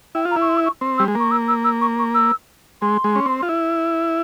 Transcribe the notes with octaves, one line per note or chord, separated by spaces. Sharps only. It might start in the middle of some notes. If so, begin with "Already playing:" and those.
E4 G5
F4
A#5
E4
C#6
C6
E6
C#6
C4
G3 E6
G#3
A#3 C#6
E6
E6
E6
C#6
C#6
E6
G#3 C6
G#3
C#4
C4
F4
E4